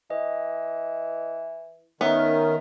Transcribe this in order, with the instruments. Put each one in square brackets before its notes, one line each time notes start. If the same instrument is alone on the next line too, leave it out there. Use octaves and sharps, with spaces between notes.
[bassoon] E3 [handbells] D#5
[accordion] D#3 [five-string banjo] B3 [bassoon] C#4 [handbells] E5